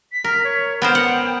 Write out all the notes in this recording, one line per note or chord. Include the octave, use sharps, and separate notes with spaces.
B6
A#4
C#5
B3 A#4 C5 G5
F#5